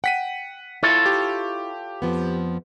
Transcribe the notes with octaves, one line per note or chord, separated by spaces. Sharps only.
F#5 G5 B6 D#7
E4 F4 A4 C#5
G4
F2 F3 B3